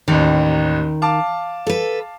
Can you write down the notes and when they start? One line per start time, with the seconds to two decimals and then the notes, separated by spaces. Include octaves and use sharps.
0.08 A1 D#2 D#3
1.02 F5 A5 D6
1.67 A4 B4